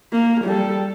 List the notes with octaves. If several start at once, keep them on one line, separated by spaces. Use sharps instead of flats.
A#3
G3 A4